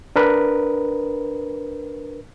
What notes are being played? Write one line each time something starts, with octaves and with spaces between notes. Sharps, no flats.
D4 A#4 B4